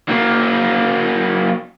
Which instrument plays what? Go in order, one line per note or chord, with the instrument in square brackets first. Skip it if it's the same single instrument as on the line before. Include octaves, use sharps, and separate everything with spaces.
[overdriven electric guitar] F#3 A#3